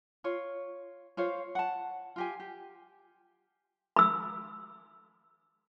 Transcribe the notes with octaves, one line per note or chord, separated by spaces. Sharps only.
F4 C#5
F4 C5 C#5 F5
F#5 A5
F4 G4 G#5
G4
B5 E6